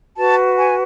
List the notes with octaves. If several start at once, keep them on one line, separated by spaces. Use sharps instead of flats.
F#4 B4 A5
G#5